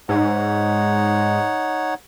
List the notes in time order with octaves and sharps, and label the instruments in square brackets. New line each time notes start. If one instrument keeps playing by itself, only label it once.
[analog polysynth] G#2 [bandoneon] D#4 C#5 F#5